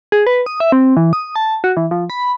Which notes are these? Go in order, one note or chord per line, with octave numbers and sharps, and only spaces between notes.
G#4
B4
D#6
E5
C4
E3
D#6
A5
F#4
E3
F3
B5